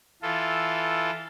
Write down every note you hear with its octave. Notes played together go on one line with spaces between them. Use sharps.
E3 F4 A4